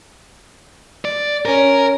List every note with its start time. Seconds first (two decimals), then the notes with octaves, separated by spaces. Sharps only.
1.05 D5
1.45 C#4 A#4